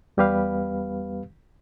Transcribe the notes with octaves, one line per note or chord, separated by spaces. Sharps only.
E2 G3 B3 G4 B4 F5